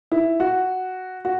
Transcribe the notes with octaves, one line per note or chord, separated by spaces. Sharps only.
E4
F#4
F#4